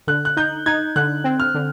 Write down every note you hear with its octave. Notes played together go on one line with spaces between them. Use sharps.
D3 F#6
F#6
D#4 G6
D#4 G#6
D3 F#6
C4
F6
D3